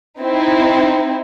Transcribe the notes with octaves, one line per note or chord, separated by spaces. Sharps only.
C4 D#4 E4